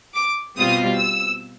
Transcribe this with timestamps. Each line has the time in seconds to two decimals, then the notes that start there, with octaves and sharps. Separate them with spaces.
0.15 D6
0.57 B2 G3 C4 F4 D#6
0.98 E6